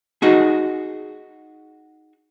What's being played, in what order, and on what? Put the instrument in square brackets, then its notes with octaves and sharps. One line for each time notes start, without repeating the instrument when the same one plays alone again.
[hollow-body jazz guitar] D#4 F#4 G#4